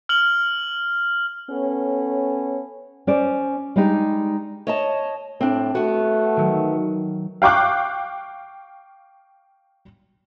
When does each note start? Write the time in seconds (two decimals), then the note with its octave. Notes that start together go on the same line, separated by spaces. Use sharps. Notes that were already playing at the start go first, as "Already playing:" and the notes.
0.09 F6 F#7
1.50 B3 C#4 A4 C#5
3.07 C#4 C5 D5
3.76 G3 G#3 D4 D#4 G4
4.67 C#5 D#5 A5
5.41 A2 C4 D4
5.75 A3 B3 F#4
6.37 D#3 F#3
7.42 F5 G5 C#6 D6 F#6